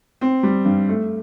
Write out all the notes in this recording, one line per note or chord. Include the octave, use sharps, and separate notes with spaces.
C4
G3
G2
A3